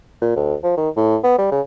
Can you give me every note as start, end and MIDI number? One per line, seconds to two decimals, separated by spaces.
0.22 0.34 46
0.36 0.54 38
0.63 0.74 53
0.77 0.89 51
0.96 1.16 45
1.23 1.37 59
1.38 1.48 55
1.52 1.61 49